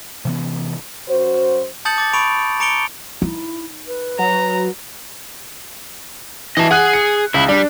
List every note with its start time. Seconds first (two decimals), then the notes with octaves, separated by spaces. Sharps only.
0.25 C3 E3 B3
1.08 F#2 F#4 C5
1.85 A5 D#6 G6 A6 C#7 F#7
1.98 D6 A6
2.14 B5 C#6 D7 F7
2.60 A#5 D6 C#7 D7 F7 G7
3.22 D#4 E4
3.87 B4
4.19 F#3 A#5
6.57 E3 D#5 A5
6.71 G#4 F#5 F#6
6.93 C#7
7.34 C#2 E4
7.49 G3 D4